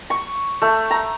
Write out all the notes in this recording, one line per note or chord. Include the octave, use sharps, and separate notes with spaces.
C#6
A3
A#5